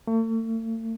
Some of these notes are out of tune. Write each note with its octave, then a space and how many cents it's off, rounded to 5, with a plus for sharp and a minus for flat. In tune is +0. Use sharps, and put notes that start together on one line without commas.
A3 +40